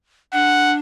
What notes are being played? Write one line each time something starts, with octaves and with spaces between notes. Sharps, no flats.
D4 F#5